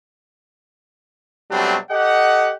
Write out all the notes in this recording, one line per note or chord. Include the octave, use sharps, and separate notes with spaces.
B2 F#3 G3 A3 C4 D4
G4 A4 D#5 F#5